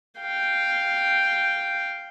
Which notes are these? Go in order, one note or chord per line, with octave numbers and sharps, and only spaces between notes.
F5 G5